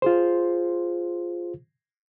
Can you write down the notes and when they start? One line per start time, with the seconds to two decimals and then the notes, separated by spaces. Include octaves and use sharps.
0.02 F4 G#4 C5